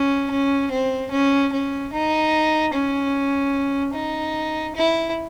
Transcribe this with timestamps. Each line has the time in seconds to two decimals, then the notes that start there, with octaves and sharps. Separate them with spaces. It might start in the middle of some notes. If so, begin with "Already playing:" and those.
Already playing: C#4
0.31 C#4
0.71 C4
1.11 C#4
1.52 C#4
1.92 D#4
2.74 C#4
3.94 D#4
4.75 E4